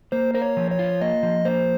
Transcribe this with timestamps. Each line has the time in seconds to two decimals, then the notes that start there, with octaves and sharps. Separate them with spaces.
0.12 A#3 C5
0.35 A#4 C5
0.42 C#5
0.57 F3
0.71 C#5
0.79 F4
1.01 A#3 D#5
1.23 F3
1.45 A#3 C5